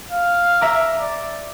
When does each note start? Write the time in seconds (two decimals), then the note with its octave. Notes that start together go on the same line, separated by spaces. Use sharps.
0.11 F5
0.61 E5 A#5 D6
0.99 D5